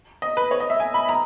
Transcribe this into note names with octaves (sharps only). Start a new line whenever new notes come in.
D#5
B4
C#5
D#5
E5
G#5
B5
A#5